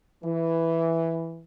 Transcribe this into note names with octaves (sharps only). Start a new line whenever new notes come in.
E3